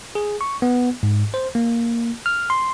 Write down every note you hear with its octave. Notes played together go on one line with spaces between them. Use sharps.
G#4
C#6
B3
G#2
C5
A#3
F6
C6